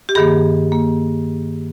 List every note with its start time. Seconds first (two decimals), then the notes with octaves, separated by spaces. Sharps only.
0.09 G4
0.15 G2 D#3 A#3 G#4
0.72 A#3